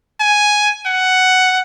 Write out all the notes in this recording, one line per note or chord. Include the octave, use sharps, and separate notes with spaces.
G#5
F#5